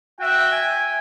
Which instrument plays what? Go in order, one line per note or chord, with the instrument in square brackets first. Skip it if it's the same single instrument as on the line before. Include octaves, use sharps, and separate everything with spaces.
[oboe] F#4 [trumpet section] E5 G5
[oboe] G#5